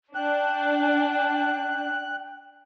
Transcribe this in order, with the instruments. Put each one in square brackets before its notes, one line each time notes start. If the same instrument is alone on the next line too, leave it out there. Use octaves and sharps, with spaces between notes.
[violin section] D4 [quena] G5 [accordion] F#6